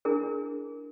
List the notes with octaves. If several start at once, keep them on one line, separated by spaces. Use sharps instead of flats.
D4 E4 G#4 A#4